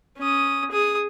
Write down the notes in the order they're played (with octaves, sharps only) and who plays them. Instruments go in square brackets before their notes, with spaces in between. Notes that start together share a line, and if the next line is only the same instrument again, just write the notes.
[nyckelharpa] C#4 D#6
G#4 D#6